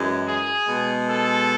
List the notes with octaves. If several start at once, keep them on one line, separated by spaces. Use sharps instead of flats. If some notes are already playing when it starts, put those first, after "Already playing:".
Already playing: F#2 E3 G#3
G#4
B2 G#3
A4